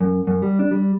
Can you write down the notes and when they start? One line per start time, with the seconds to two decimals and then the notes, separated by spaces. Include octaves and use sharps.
0.01 F#2
0.27 F#2
0.42 G3
0.59 D4
0.71 G3